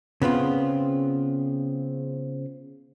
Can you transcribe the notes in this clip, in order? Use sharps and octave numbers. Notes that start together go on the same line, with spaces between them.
C#3 B3 C4 F4